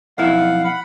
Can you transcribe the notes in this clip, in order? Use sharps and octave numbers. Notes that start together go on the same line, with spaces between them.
B1 F2 E4 F5 F#5
F#5 B5